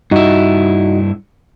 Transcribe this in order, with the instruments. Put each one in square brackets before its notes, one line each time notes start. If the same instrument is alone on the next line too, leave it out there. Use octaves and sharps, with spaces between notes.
[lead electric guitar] G2 E4 [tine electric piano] D#4 F#4 D#5